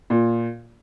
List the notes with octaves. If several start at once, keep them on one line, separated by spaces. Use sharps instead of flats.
A#2